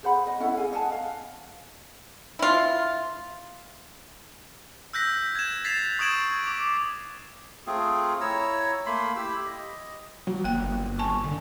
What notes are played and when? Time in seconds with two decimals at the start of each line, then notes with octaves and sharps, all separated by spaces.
0.03 G#4 C5 F#5 B5
0.27 D#5
0.40 C#4 E4 A4 F#5
0.57 G#4 F5 G#5
0.72 D#5 F#5 G#5 A5
0.92 F5
2.39 E4 F4
4.93 E6 F#6 G6 A#6 B6
5.35 G#6 E7
5.65 A6 B6 C7 E7 F7
5.99 C#6 D#6 G#6 D7 E7 F#7
6.47 D6
7.67 A3 C4 F4 G#4
8.20 E4 C#5 A#5 E6
8.86 A3 A#3 B5 C6
9.16 E4 G4 B5 E6
9.46 D#5
10.27 F#3
10.44 G1 A#3 G5
10.99 G#5 A5 C#6
11.24 D3